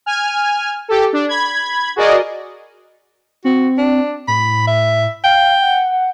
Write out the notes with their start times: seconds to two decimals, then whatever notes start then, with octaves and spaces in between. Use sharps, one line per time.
0.06 G#5 F6
0.88 G4 A4
1.13 D4
1.29 B5 G#6
1.96 F#4 G#4 A#4 D5 D#5
3.45 C4 F#4
3.78 D4
4.28 A2 B5
4.67 E5
5.24 F5 G5
5.62 F#5